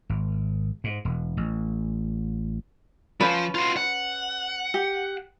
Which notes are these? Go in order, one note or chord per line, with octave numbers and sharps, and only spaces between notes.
G#1
G#2
E1
A1
F3 C#4 B4
F4 F#4
F#5
G4